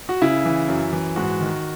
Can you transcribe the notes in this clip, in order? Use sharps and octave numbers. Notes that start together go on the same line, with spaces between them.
F#4
C#3 E4
E3
F#2
E3
G#2 F#4
D#3